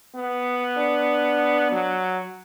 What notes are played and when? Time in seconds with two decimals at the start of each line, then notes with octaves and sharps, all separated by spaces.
0.16 B3
0.77 D4
1.72 F#3